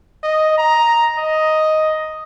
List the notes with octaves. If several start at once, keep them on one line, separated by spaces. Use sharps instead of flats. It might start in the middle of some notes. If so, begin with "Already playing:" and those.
D#5
A#5
D#5